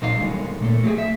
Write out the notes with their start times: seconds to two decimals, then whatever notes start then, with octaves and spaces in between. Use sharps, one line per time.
0.02 A#2 F#3 D#4 F5
0.18 D3 D#3 G3 G#3
0.60 A#2 A3 A4
0.84 F#3 A3 G4 G#4
0.98 E5